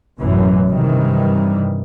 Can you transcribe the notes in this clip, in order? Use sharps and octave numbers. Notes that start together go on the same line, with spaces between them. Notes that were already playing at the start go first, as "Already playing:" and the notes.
A1 F#2 B2 E3
G2 C3 D#3 E3 G3